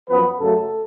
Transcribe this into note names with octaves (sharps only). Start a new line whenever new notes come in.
F#2 F3 B3 B4
F#2 C#3 F#3 A3 A4